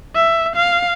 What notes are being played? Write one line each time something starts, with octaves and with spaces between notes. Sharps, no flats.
E5
F5